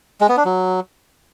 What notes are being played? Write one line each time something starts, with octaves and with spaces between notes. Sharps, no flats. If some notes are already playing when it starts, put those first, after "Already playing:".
G#3
B3
D4
F#3